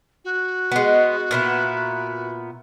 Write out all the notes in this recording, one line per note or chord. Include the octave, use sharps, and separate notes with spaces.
F#4
G#3 B3
A#2 B3 E4